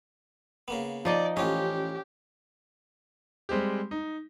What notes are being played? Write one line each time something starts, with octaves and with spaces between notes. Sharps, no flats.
C#3 A#3 B3
F3 D#4 D5 D#5
A1 C#4 F4 G4 D#5
G3 G#3 C4 G4
D#4